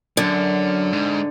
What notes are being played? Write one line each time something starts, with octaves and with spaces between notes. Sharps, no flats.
F#2 D3
G#2